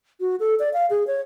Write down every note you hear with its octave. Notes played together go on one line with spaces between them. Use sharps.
F#4
A4
D5
F5
G#4
C#5